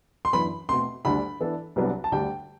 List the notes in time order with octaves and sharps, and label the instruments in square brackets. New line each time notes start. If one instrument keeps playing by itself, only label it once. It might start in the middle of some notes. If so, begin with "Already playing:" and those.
[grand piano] C6
[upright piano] F#2 E3 B3 D4 [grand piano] B5
[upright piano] B2 A3 C4 [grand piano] C6
[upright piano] D2 D3 G3 D4 [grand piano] B5
[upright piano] E3 B3 D4 A4
C2 C3 F#3 B3 D4
[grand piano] A5
[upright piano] D2 D3 G3 D4 G4 [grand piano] G5